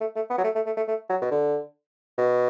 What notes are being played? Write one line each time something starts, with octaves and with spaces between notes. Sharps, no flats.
A3
A3
B3
F#3
A3
A3
A3
A3
A3
F#3
B2
D3
B2